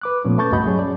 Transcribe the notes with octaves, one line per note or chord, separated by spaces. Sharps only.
B4 D6 F#6
A#2 F3 A3 B3 C#4
A3 B4 A5 C#6 G6 A6
C#2 G2 F#4 D#5 B5 G6
F#3 C#4 G#4 C#5
D5